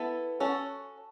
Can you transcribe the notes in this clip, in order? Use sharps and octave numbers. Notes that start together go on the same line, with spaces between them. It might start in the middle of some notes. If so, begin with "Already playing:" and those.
Already playing: B3 E4 A4
C#4 F#4 A4